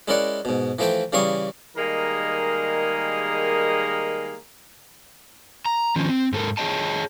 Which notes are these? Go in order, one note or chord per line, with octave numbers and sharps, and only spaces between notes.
G#3 C#4 E4 A#4 D5 F#5
G#2 B2
E3 F3 A3 E5 G5
C#3 E3 G3 F5 C#6 D#6
D#3 G3 G#3 A#3 G#4 A#4
A#5
D#3 F3 C#4
C4
G#2 A4 A#4
G#4 B4 C#5 D#5 G5 A5